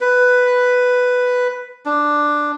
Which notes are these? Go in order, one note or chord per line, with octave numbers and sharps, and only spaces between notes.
B4
D4